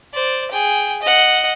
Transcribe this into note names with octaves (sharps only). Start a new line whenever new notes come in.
C5 D5
G#4 G5
D#5 F#5